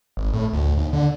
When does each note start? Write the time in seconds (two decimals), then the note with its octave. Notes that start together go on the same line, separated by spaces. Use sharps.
0.17 G#1
0.33 A2
0.53 D2
0.77 D#2
0.93 D3